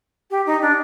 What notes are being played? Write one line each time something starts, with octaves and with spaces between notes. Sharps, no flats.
G4
D#4
D4